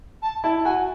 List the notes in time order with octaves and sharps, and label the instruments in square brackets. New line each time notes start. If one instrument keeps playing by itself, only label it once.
[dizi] A5
[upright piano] E4 [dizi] A5
[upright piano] F#4 [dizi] G#5